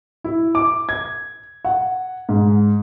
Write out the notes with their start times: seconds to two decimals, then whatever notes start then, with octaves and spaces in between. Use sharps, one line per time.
0.24 E4
0.55 D6
0.89 G#6
1.65 F#5
2.29 G#2